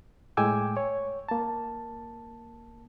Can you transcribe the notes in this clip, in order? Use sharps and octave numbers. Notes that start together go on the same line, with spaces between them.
A2 G#3 G5 G#5 D6 E6
C#5
A#3 A5